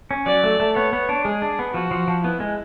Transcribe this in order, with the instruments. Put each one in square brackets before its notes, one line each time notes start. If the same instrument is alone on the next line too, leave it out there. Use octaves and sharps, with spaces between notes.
[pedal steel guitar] C#4
[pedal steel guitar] F#3 [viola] D5
[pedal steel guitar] A3
A3
[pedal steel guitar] B3 [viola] C#5
[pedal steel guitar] B3
D4
[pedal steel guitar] G#3 [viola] G#4
[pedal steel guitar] D4
B3
[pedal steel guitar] F3 [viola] F#4
[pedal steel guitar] F3
F3
[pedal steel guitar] B3 [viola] E4
[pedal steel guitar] G#3